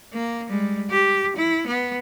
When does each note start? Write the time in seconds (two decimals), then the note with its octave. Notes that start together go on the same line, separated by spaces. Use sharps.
0.13 A#3
0.49 G3 G#3
0.91 G4
1.36 E4
1.67 B3